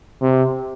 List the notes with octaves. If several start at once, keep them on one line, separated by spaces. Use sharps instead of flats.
C3